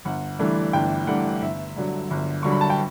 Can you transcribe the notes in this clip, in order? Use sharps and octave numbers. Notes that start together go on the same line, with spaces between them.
G1 F#5
G2 E3 A3 D4
G1 G5
G2 E3 A3 D4 F#5
G1 E5
G2 D3 F#3
G1
G2 D3 F#3 C#6
B5
A5
G5